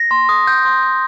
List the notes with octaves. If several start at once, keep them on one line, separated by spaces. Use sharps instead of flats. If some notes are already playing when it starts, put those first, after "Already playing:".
Already playing: A#6
C6
D#6
G6
C6
G6